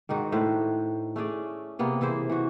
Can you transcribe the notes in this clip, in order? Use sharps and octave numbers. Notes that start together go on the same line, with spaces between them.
G#2 D#3 D#4 F#4
A2 B4 C5
A3 C#4 G#4 D5
C3 A#3 B3 G#4
E3 E4 G#4 C5
E3 F#4